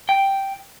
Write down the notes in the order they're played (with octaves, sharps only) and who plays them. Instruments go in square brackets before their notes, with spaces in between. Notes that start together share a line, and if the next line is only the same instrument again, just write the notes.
[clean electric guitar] G5